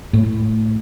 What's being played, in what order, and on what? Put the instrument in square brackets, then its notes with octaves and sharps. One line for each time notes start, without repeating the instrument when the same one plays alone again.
[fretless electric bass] A2